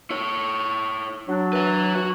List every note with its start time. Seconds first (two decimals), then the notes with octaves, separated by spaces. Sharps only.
0.10 E4 C#5
1.28 F#3 D4
1.53 B4 E5
1.95 F#4